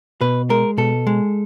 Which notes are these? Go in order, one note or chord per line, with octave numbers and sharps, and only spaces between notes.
B2 B4
G#3 A#4
B2 A4
G#3